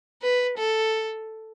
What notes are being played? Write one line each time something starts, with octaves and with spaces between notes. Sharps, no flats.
B4
A4